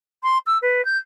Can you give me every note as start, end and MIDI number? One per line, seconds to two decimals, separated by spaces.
0.23 0.38 84
0.47 0.58 88
0.62 0.85 71
0.85 0.98 91